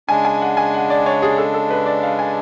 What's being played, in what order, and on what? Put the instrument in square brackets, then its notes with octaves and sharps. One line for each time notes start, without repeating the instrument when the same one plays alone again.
[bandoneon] C#3 G#3 D4 [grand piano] G#5
[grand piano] G#5
F#5
G#5
F#5
D5
C#5
G#4
A4
A4
B4
D5
F5
G#5